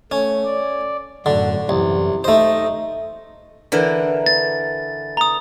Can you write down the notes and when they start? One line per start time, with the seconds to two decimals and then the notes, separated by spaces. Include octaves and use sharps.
0.11 A3 C#4
0.45 D5
1.26 F#2 A2 D3 F#4
1.69 C2 F#2 E3
2.24 A3 D#4 C5 D#5
3.72 D3 E3 A#4
4.26 A6
5.17 A#5 D#6